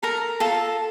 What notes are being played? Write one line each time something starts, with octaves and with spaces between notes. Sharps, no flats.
A4 A#4 A#5
F4 A4 A5